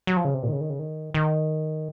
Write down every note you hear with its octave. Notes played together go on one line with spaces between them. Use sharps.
F#3
F3
C#3
C3
A#2
D#3
C#3
D#3
C#3
D#3
D#3